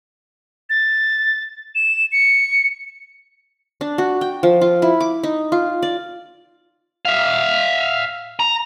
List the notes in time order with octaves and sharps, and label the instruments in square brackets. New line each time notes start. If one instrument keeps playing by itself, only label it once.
[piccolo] A6
E7
C#7
[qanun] D4
F#4
G5
F3
F4
E4
D6
D#4
F4
D5
[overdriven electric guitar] E5 F5
A#5